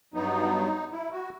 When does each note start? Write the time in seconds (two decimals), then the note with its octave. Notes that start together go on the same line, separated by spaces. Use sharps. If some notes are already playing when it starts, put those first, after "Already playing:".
0.14 G2 F#3 B3 D#4
0.91 E4
1.12 F#4